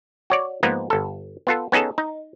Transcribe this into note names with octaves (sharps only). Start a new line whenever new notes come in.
F#4 C#5 D5
G#2 F3 A#3 B3 D#4
G1 A4
B3 F4 A4
B3 C#4 D#4 G#4 A4
D#4